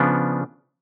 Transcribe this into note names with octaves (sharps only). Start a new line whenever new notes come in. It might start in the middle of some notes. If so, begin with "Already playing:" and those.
Already playing: C#3 F3 B3 D4